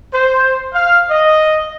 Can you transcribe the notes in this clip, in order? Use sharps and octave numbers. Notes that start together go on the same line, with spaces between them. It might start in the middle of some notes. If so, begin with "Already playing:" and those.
C5
F5
D#5